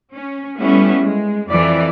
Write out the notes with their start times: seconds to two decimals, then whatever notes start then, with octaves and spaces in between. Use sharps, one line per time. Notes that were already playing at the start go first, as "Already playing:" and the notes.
0.14 C#4
0.59 G3 A3 B3 C#4 E4
1.04 G#3
1.49 F2 E3 D5